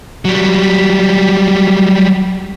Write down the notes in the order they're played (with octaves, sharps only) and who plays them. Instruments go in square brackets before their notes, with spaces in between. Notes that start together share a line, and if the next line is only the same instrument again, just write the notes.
[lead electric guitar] F#3 G3